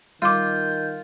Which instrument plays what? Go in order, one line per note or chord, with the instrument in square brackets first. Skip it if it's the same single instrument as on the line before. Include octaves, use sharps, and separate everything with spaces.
[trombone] D#3 [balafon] G3 C6 D6 [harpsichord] F4 [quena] G6